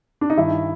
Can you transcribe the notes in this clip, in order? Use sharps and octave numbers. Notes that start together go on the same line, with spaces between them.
D4
D#4
G2 D#3 E4